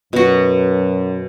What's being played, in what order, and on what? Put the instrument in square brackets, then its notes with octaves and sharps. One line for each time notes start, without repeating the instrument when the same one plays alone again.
[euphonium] F#2 [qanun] B2 F#4